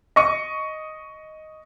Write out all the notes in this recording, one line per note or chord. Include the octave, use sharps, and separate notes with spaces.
D#5 C#6